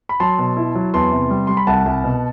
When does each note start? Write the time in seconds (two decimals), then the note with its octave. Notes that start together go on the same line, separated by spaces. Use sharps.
0.09 B5
0.20 F#3 A5 C6
0.39 B2
0.57 E4
0.75 F#3
0.94 E2 A5 C6
1.12 C3
1.30 G3
1.47 G3 C6
1.57 B5
1.67 C2 F#5 A5
1.85 C2
2.04 B2